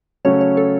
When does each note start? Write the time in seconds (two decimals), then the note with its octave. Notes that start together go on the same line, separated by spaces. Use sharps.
0.25 C#3 F#3 A3 C#4 C#5
0.41 C#5
0.57 A4